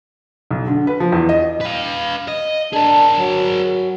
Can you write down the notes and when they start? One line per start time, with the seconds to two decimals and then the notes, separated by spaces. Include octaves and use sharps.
0.51 B1
0.68 D3
0.87 B4
1.00 F3
1.13 E2
1.29 D#5
1.61 B4 F5
2.28 D#5
2.73 D4 G#4 A#4
3.17 F#3